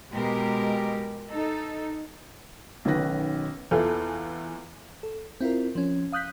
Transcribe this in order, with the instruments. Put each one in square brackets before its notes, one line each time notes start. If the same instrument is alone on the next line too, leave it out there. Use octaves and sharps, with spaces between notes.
[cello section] B2 G#3 G4 A#4
D#4 A4
[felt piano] B1 B2 D#3 C#4 B4 A#6
[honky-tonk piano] E2 E3 F4 [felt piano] A4
[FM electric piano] A4
C4 E4 F4 A#4
F3 C#4
F5 D#6 F#6 G6 B6